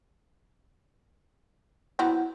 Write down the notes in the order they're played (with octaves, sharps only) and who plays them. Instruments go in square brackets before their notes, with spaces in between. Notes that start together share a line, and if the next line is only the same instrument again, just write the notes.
[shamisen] F#3 B3 C4 [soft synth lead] E4